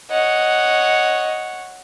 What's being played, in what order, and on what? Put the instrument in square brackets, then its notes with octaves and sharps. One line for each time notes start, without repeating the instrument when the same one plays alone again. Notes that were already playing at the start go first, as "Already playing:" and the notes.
[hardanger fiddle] C#5 F#5 [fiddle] D#5